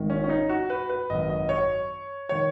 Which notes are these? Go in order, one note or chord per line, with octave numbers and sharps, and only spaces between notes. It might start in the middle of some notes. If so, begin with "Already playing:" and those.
Already playing: G#1 G#2 D#3
C#4
C#4
D#4
F#4
B4
B4
G#1 F#2 D#3 D#5
D#5
C#5
D#3 C#5